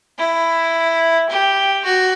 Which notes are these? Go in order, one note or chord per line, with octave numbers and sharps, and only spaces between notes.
E4
G4
F#4